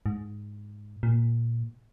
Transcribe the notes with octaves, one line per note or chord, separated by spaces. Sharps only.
G#2
A#2